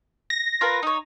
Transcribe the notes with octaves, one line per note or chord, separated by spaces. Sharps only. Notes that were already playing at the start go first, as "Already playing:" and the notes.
A#6
F4 A#4 B4
D#4 C#5